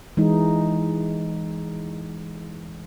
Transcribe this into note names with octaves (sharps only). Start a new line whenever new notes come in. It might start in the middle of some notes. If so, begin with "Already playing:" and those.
E3 G#3 D#4